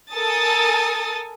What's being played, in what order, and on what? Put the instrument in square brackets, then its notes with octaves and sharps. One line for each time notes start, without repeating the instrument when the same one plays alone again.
[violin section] A4 A#4 G#5 A5 D#6 A6